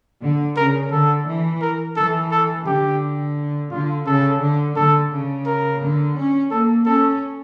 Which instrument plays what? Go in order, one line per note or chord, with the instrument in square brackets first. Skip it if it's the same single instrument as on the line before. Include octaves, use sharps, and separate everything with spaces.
[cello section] D3
[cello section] C#3 [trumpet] A#4
[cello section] D3 [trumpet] A4
[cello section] E3
[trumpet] A#4
[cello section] E3 [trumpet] A4
[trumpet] A4
[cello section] D3 [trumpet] G4
[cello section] D3 [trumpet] F4
[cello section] C#3 [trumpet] A4
[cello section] D3
[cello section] D3 [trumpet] A4
[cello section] C#3
[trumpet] A#4
[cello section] D3
C#4
[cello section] A#3 [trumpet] A4
[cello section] C#4 [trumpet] A4